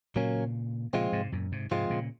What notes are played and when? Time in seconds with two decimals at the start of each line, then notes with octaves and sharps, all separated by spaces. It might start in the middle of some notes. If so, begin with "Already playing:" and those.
0.16 A#2 C#3 F#3 A#3 C#4
0.93 A#2 C#3 F3 G#3 C4 F4
1.12 G#2 C3
1.32 F#2 A#2
1.52 G#2 C3
1.71 G#2 C3 F3 G#3 C4 F4
1.90 A#2 C#3